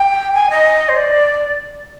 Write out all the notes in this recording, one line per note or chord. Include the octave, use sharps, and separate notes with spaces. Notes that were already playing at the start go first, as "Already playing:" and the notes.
Already playing: G5
G#5
D#5
C5
D5